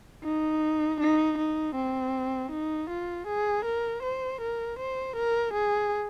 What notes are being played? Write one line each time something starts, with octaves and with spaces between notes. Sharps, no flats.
D#4
D#4
D#4
C4
D#4
F4
G#4
A#4
C5
A#4
C5
A#4
G#4